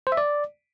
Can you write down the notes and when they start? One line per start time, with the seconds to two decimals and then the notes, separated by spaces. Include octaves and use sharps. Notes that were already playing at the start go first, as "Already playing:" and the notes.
0.07 C5
0.12 E5
0.17 D5